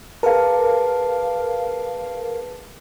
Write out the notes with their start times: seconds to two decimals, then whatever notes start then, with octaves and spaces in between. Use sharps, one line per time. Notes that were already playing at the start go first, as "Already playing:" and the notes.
0.23 G#4 A#4 B4 F5 A5